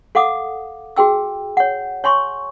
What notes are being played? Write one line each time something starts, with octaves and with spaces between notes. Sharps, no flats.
A4 F5 F#5 D6 D#6
F#4 G#4 G5 E6
C#5 F#5
C#5 G#5 C6 C#6